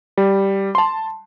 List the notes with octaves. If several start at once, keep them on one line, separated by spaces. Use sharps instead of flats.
G3
A5 C6